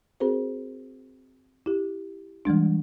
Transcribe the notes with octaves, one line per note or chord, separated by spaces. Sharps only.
C4 F#4 G#4 A#4 C5
E4 G4
E3 G3 G#3 D4